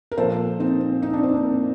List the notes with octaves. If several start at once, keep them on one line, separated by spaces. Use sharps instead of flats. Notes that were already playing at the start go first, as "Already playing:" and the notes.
A#4
A#2 F3 A4 C5
C4 D#4
D#4
D4
C4
A#3 D4